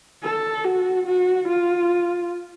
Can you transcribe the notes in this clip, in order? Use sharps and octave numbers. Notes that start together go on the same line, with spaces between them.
A4
F#4
F#4
F4